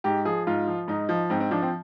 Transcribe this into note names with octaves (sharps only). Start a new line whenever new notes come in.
G#2 G4
F3 G#4
G#2 F4
F3
G#2 D#4
F3
G#2 C4
C4
F3 D4
C4